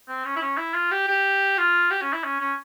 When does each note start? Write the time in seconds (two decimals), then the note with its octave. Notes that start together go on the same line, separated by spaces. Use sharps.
0.08 C4
0.25 C#4
0.36 E4
0.41 C#4
0.58 E4
0.74 F4
0.91 G4
1.08 G4
1.58 F4
1.91 G4
2.02 C#4
2.13 E4
2.24 C#4
2.40 C#4